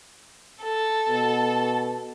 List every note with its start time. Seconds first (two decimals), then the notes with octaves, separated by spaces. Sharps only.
0.63 A4
1.09 B2